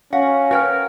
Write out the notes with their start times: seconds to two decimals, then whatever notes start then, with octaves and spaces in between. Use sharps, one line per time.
0.13 C#4 F#4 F5 F#5
0.51 F#4 A#4 B4 C#5 G5 F6